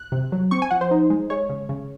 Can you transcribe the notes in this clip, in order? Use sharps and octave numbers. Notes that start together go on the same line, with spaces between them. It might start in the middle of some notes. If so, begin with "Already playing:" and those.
Already playing: F#6
C3
F#3
C4 C#6
G#5
F3 F#5
C5
D#4
G#3
G#3 C#5
C#3
C#3